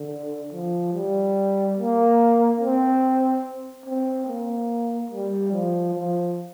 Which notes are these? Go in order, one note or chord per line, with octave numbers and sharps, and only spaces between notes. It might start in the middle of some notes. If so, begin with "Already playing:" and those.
Already playing: D3
F3
G3
A#3
C4
C4
A#3
G3
F3
F3